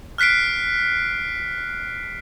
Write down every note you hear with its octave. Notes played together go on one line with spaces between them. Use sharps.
F6 F#6 B6 C7 D7